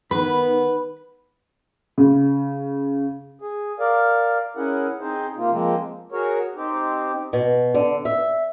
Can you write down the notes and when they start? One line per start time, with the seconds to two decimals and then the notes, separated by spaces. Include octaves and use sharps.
0.11 D#3 B3 B4 B5
1.98 C#3
3.42 G#4
3.80 A#4 D5 F5
4.57 C#4 E4 G#4 A#4 F#5
5.01 C4 D#4 G#4 C5
5.37 C3 A#3 F4
5.52 F3 G#3 A#3 C4
6.12 F#4 G#4 A#4 C#5
6.55 C4 D#4 G4
7.33 B2
7.74 D3
8.05 E5